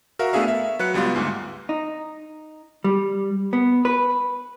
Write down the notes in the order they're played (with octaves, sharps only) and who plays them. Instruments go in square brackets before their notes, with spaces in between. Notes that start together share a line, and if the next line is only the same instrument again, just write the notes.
[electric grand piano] F#4 A#4 E5 F5
A3 B3 D4 G#4 E5 F5
E5
F#3 B4 F#6 C#7
C#2 G3 B3 F4
D2 G#2
[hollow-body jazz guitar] D#4
G3
B3
B4